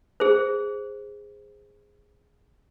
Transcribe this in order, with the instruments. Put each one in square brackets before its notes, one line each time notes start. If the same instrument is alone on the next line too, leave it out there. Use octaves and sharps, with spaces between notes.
[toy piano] G#4 C5